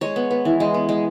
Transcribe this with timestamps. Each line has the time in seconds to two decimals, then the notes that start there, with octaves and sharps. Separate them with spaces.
0.01 G#3 C#5
0.16 B3
0.31 B3
0.45 E3
0.60 G#3
0.74 B3
0.89 G#3